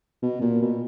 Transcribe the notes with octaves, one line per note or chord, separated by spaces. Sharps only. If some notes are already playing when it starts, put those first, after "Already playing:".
B2
A#2
B2